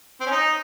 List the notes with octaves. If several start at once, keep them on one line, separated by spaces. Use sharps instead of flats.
C4
C#4
D#4